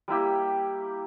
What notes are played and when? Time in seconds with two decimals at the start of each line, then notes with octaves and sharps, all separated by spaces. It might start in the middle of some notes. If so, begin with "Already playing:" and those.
0.08 G3 A#3 E4 G4